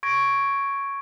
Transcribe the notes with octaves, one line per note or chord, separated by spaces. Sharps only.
C#6 G#6 A#6 D7